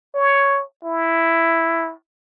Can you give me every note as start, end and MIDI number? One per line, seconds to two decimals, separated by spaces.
0.14 0.62 73
0.84 1.92 64